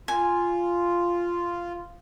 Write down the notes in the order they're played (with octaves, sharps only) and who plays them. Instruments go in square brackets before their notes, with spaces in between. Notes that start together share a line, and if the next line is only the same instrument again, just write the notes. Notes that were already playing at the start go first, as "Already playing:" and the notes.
[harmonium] F4 [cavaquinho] G#5